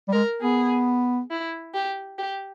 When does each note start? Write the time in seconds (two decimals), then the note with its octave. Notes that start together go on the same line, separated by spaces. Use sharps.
0.09 G3
0.13 G#3 A#4
0.42 B3 G#4
1.31 E4
1.74 G4
2.18 G4